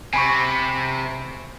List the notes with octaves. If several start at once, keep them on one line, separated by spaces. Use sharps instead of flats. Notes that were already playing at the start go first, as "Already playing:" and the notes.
C3 G#5 B5 C#6